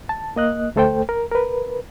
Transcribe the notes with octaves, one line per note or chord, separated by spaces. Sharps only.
A5
A#3 D#5 F#6
D2 A3 A4 C5 G5
A#4
A#4 B4